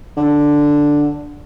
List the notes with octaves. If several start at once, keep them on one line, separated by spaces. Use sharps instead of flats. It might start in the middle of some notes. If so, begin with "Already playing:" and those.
D3